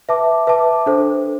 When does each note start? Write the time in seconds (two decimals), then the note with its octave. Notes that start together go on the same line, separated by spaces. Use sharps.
0.09 B4 E5 A5 D6
0.47 B4 E5 A5 D6
0.86 D4 A4 C5